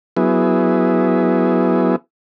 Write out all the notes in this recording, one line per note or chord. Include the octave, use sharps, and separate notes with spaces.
F#3 B3 E4 G#4